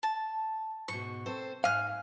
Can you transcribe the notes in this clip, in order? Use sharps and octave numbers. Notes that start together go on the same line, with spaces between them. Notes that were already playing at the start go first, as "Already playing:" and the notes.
A5
G#2 B2 C#6
C4 A4 C5
G#2 F5 G#5 F6 F#6